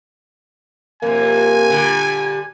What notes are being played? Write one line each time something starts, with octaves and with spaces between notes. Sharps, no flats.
F2 C3 A#3 G#5
A#2 D3 G3